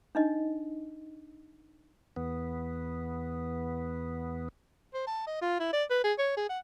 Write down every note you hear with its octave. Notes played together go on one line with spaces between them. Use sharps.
D4 D#4 D#5
E2 B3
C5
A5
D#5
F4
E4
D5
B4
G#4
C#5
G#4
F#5